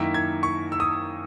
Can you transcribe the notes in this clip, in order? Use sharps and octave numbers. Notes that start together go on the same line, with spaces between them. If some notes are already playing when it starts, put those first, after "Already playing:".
Already playing: F#2 D#3 A#3 E4 B6
G#6
C#6
E6
D#6